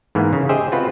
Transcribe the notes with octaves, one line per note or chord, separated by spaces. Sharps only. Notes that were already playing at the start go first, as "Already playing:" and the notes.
G#2 E3 A#3 B3
C#3
G4 G#4 C5 D#5 E5 G5
C4 F4 F#4 B4